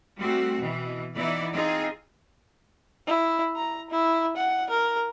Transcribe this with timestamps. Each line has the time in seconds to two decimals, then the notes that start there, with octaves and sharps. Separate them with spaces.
0.17 G3 A3 C4 F#4
0.58 B2 E3
1.14 E3 B3 D#4 E4 D5
1.54 C4 D#4 F4 G#4
3.07 E4
3.56 A#5
3.90 E4
4.37 F#5
4.70 A#4